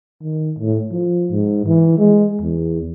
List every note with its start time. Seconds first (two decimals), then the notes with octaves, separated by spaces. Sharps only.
0.22 D#3
0.58 A2
0.91 F3
1.31 G#2
1.66 E3
1.98 G#3
2.42 E2